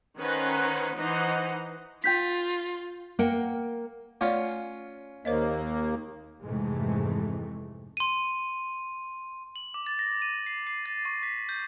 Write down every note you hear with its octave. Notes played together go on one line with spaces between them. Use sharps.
D#3 C#4 B4 C5 F#5 A#5
E3 D#4 B4 C5 D#5 F#5
F4 G5 G6 B6
A#3 A#4 F#5 G5
A3 C#4 F4 D5
D#2 A#3 C5 C#5 D#5
F2 G#2 C3 E3 G#3 A3
C6 D#7
F#7
D6
A6
A#6
D#7
C7
C7
A6
C#6
B6
G6